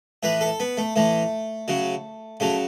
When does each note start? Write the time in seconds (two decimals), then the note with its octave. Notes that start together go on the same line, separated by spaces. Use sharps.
0.23 A2 E3 B4
0.41 A4
0.60 B3
0.77 A3
0.96 A2 E3 A3
1.68 C#3 F#3
2.40 C#3 F#3 A3